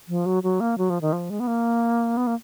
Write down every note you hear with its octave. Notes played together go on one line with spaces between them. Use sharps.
F3
F#3
F#3
A#3
F#3
F3
D#3
F3
G#3
B3
A#3
B3
A#3